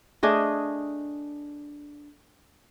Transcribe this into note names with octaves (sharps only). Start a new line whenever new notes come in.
A3 D4 G#4 D#5